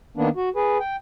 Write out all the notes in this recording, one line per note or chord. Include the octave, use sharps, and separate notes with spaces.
D#3 A#3 B3 D4
F#4
G#4 B4
G5